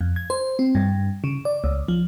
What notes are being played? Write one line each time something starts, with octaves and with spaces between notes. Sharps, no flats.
F2
G#6
C5
C4
G2
C#3
D5
C#2
F3